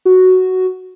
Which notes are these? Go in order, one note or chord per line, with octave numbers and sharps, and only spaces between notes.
F#4